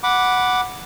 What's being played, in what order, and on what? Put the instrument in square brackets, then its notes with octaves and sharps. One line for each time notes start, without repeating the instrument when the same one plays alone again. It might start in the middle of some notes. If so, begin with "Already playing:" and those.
[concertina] F#5 B5 D6